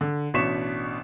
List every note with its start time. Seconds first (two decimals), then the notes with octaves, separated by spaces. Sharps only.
0.01 D3
0.34 A1 B2 D4 C#6 B6 E7